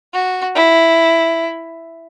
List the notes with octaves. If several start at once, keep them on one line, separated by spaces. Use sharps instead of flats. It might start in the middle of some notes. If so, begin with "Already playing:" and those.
F#4
E4